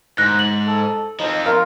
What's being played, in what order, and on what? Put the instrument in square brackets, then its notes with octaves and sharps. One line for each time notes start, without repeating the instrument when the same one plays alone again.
[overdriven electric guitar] G#2 [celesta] F#6 A#6
[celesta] F#7
[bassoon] A4
[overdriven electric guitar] F3 C4 [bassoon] D#4
[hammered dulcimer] F4 [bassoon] A#4